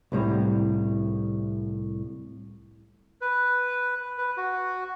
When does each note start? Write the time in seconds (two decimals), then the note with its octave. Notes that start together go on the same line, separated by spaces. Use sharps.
0.12 C2 A2 G3
3.21 B4
4.18 B4
4.37 F#4